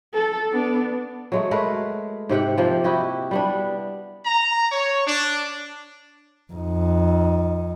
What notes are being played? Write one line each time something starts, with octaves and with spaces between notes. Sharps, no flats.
A4
B3 D4
F#3 G#3 A3
G#3 A3 A#4 B4
G#2 C3 G4 F#5
C3 F3 A#3
E4 F#4 G4 D#5
G3 B3 D4
A#5
C#5
D4
F2 D#4